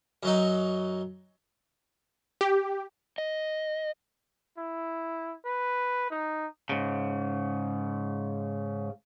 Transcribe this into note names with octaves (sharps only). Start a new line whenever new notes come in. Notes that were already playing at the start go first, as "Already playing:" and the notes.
F#2 F#3 D#4
G4
D#5
E4
B4
D#4
G#2 C#3